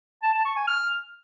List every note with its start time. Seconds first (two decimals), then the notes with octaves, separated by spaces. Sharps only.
0.23 A5
0.34 A5
0.45 C#6
0.56 G#5
0.67 F6